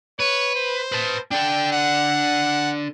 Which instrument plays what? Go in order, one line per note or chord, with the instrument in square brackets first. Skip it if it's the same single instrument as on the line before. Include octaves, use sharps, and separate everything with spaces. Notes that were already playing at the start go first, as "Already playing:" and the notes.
[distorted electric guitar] B4 [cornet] C#5
[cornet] C5
[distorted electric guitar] B4 A5
[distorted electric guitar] D4 A4 [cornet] G5
[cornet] F#5